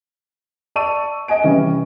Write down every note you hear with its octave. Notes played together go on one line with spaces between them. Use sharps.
D5 A5 C#6 E6 D#7
D#5 F#5 G#5 D7
C3 E3 G3 C#4